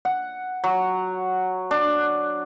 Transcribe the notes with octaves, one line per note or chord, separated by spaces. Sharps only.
F#5
F#3
D4